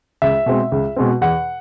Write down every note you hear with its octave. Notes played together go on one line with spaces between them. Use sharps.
C#2 E5
B2 G#3 C4
C#2
B2 G#3 C4
E2 F#5